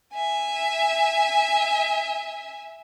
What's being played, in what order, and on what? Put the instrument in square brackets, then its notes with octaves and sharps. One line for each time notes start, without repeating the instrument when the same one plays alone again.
[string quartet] E5 G#5